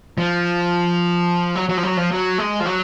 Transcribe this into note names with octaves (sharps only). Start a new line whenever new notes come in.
F3
F#3
F#3
F3
F#3
F3
F#3
G#3
F3
F#3